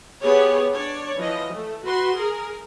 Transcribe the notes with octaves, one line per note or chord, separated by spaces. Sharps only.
B3 G4 G#4 C#5
D4 C#5 D5
E3 F3 D#5
A3
F#4 B4 C6
G#4 A#4